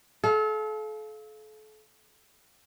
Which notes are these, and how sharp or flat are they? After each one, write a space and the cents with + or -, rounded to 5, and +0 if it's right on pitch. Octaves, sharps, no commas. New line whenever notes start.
A4 -35 F5 -5